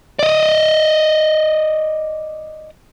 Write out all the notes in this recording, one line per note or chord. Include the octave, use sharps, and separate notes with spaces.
D5 D#5